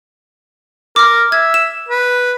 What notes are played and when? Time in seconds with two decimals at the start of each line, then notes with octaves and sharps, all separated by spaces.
0.96 A#4 D6 F6
1.32 E5 G#6
1.54 E7
1.89 B4